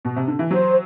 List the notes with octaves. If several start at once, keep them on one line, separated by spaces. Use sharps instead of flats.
B2
C3
D3
E3
F#3 C5